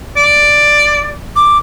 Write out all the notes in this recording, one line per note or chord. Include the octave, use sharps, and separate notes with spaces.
D5
D6